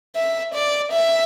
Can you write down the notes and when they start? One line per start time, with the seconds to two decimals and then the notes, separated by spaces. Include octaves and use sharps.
0.16 E5
0.54 D5
0.92 E5